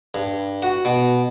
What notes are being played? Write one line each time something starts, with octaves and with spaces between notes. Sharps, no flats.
G2
F#4
B2